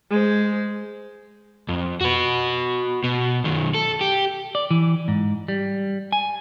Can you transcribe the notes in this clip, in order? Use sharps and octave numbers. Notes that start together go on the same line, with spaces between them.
G#3 C5
F2
F#4 B4
B2
B1 D#3
A4
G4
D5
E3
G#2
G3
G#5